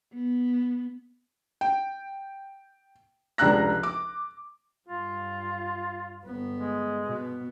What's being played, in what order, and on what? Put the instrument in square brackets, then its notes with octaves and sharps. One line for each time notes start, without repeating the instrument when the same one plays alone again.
[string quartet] B3
[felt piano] G5
F1 C#2 D4 A#5 F#6 A#6
D6
[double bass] G2 [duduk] F4
[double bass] G1 B3
[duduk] G#3
[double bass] B2 B3